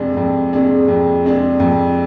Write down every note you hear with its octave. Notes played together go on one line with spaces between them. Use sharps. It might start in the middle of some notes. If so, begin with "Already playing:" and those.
Already playing: F2 C3 G#3 D4 G#4
F2
C3 G#3 D4 G#4
F2
C3 G#3 D4 G#4
F2